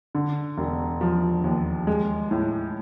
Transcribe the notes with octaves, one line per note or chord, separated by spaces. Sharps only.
D3
E1
F3
D#2
G#3
A2